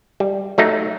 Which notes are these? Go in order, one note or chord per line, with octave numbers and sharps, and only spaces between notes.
G3
F#3 A3 D#4